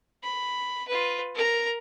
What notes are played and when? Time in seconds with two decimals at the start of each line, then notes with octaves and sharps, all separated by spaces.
0.22 B5
0.88 F4 B4
1.34 A#4 A#5